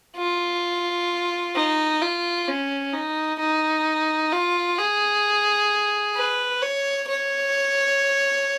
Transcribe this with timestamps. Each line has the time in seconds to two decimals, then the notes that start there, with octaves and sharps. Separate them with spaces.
0.17 F4
1.55 D#4
2.01 F4
2.48 C#4
2.93 D#4
3.40 D#4
4.32 F4
4.78 G#4
6.16 B4
6.62 C#5
7.08 C#5